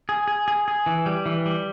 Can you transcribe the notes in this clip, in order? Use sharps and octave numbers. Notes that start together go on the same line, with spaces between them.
G#4
G#4
G#4
G#4
E3
G3
E3
G3